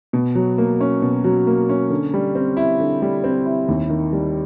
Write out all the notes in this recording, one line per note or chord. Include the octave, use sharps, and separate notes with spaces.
B2
F#3
A#3
C#4
B2
F#3
A#3
C#4
D3
G3
C4
E4
D3
G3
C4
E4
D#2
D#3
G3